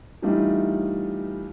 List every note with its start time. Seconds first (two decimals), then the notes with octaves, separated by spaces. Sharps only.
0.22 E3 G3 A3 D4 D#4 F4